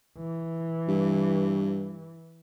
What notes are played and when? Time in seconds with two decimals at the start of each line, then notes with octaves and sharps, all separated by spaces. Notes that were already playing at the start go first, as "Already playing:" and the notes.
0.18 E3
0.88 G2